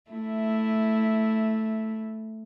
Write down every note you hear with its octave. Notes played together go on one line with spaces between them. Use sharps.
A3 E4